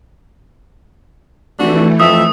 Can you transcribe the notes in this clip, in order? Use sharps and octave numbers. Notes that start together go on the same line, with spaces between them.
F1 E3 A3 D4 F#4
F2 E5 D#6